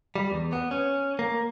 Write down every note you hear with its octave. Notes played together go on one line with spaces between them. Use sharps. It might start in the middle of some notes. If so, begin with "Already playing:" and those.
G3
E2
B3
C#4
A#3